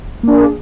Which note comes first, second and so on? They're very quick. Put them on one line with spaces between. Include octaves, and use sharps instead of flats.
A#3 D4 G#4